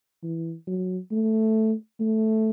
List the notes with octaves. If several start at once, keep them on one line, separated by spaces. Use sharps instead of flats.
E3
F#3
A3
A3